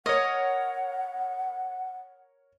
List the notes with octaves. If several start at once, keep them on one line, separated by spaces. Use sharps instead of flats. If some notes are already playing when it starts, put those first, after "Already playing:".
A#4 C#5 D#5 F#5